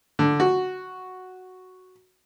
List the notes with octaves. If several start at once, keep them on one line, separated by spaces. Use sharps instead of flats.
D3
F#4